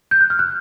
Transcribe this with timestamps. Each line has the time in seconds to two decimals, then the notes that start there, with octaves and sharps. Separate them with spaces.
0.11 G6
0.21 F#6
0.30 F6
0.39 F#6